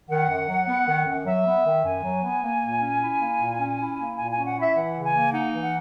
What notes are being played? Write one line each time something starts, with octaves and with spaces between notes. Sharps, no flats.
D#3 F#5
F#2
F#3
B3
D#3
F#2
F#3 E5
B3
D#3
F#2 G#5
F#3
B3
A#3
A#2
C#4
E4
A#3
A#2
C#4
E4
A#3
A#2 G#5
C#4 G#5
F#5
E4
E5
E3 F#5
C#3
G#5
A#3
D#4 F#5
E3
F#5